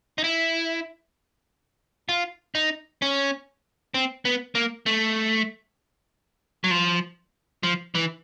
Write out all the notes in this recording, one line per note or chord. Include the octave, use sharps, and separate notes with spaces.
D#4
E4
F4
D#4
C#4
C4
B3
A#3
A3
F#3
F3
F3
E3